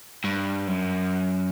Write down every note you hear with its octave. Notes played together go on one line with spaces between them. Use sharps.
G2
F#2